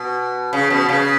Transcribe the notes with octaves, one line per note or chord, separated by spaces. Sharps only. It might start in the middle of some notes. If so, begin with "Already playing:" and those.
Already playing: B2
C#3
B2
C#3